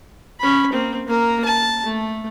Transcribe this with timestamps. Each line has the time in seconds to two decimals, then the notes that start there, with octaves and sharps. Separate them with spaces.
0.40 C#4 B5
0.72 A#3 C4
1.07 A#3 A#4
1.45 A5
1.84 A3